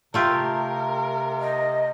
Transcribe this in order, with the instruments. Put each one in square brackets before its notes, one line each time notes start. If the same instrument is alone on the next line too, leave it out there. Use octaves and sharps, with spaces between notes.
[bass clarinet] C3 [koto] A3 F4 G4 [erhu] A#4
[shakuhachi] D#5